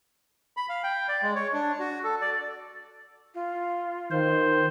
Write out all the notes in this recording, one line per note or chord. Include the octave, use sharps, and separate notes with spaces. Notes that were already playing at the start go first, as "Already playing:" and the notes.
B5
F5
G5
D5
G#3
C#5
D4
F#4
A4
D5
F4
D#3 C5